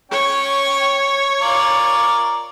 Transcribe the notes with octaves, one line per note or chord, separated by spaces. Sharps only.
C#4 C#5 G5
F4 A#4 D5